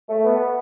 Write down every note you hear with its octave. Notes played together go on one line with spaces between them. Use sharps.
A3
B3